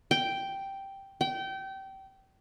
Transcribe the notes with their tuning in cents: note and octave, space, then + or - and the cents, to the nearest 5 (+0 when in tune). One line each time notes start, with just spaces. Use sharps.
G5 -5
G5 -25